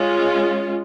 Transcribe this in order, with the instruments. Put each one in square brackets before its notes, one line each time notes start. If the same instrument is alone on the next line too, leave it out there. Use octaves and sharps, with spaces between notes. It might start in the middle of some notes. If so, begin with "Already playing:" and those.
Already playing: [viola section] G#3 C#4 F4